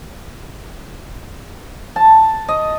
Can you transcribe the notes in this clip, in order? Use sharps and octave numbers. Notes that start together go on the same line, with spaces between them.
A5
D#5